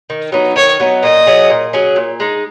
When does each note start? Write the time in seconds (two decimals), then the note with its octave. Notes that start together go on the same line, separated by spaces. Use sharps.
0.10 D#3
0.32 F#3 B3 D#4
0.56 D#3 C#5
0.80 F#3 B3 D#4
1.03 A#2 D#5
1.27 F#3 C#4 G#4
1.50 A#2
1.73 F#3 C#4 G#4
1.96 A#2
2.20 G#3 D#4